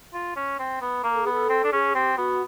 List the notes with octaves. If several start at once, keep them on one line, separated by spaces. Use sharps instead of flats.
F4
C#4
C4
B3
A#3 A#4
A4
B3 G#4
A4
C4
D4
C#4 G#4
C4 G4
B3 F#4